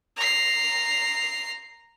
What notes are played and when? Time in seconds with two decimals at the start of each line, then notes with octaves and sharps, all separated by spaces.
0.17 A#5 C7